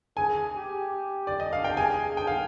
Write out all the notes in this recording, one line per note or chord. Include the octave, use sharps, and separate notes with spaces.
G#4 G#5
G4
D5
D#5
F5
G5
G#4 G#5
G5
F5